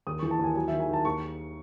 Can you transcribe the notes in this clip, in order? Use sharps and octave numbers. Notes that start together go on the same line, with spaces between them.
D#2 D#6
E3 C#6
A5
D#2 G#5
F#3 G#5
D#3 E5
G#5
D#3 A5
D#2 C#6